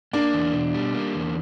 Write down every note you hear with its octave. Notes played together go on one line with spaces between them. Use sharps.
A#3 D4
E2
B2
G3
A#3
E2